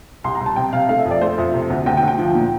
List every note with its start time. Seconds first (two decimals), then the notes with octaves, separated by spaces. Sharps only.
0.24 C2 C6
0.35 A#5
0.41 C2
0.46 A5
0.56 C3 G5
0.73 C3 F5
0.89 A3 F5
1.00 E5
1.05 F2
1.11 D5
1.21 A3 C5
1.38 F2 E5
1.54 C3
1.70 D2
1.86 D2 G5
1.97 G5
2.03 D2
2.08 G5
2.18 F3
2.35 A#2